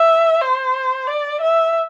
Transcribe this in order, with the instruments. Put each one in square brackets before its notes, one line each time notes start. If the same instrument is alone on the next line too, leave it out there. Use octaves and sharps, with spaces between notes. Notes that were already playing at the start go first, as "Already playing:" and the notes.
Already playing: [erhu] E5
C5
D5
E5